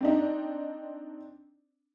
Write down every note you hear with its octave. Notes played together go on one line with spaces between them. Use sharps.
C4 D4 D#4